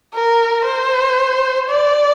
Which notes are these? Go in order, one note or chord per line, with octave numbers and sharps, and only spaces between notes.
A#4
C5
D5